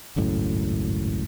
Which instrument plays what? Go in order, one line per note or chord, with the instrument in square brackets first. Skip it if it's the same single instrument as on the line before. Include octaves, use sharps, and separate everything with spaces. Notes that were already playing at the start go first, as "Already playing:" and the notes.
[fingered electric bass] G#1 C#2 F#2 A2